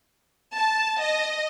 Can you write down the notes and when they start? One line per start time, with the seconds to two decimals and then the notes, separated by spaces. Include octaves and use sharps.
0.56 A5
1.02 D#5